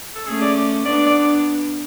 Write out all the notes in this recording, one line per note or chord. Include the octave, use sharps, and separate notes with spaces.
A4
A3 C#4 G#4
D5
B3 D4 D5
D5